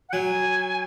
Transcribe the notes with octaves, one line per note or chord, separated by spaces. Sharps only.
F#5
F#3 G#5